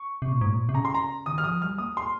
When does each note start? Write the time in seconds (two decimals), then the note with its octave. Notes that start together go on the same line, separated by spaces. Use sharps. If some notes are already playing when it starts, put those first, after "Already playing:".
Already playing: C#6
0.22 C3
0.32 A#2
0.41 G#2
0.50 A#2
0.69 C3
0.74 C#3 A#5
0.85 C6
0.94 A#5
1.26 D#3 D#6
1.38 F6
1.44 F3 D#6
1.62 G3 F6
1.78 A#3 D#6
1.97 C6